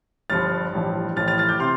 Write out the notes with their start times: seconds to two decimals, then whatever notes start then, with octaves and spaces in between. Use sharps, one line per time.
0.30 G1 G2 F3 F6 A6
0.73 A1 G2 F3
1.16 A1 A2 F3 F6 A6
1.28 F6 A6
1.38 F6 A6
1.49 D6 G6
1.60 C3 C6 F6